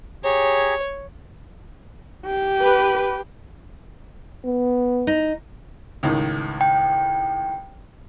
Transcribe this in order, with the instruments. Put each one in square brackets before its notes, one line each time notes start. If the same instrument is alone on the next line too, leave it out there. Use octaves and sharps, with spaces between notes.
[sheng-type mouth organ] G4 G#4 A#5 [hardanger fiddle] C#5
[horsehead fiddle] G4
[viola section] B4
[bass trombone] B3
[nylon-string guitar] D#4
[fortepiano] C#2 A2 D#3
[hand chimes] G5